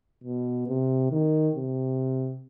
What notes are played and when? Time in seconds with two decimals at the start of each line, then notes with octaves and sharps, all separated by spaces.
0.24 B2
0.68 C3
1.11 D#3
1.55 C3